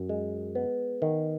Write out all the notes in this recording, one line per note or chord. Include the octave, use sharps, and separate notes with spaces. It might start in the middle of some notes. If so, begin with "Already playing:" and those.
Already playing: F#2
G#3
B3
D#3